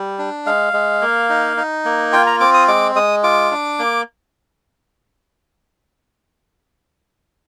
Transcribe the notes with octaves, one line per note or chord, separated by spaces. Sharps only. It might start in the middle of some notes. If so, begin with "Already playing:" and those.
Already playing: G3
D4
G#3 F5
G#3
A#3
D#4
D#4
A#3
F4 G5
A#5
C4 D6
D#6
G#3 D6
G#3 D#6
F4 D6
D4
A#3